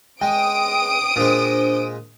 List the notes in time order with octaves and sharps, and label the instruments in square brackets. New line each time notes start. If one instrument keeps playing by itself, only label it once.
[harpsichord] G#3 [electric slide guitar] G5 [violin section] D#6 D7
[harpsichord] A#2 G#3 [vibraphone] D4 C5